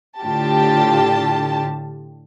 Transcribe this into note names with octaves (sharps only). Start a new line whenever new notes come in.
A2 D3 F4 G4 A5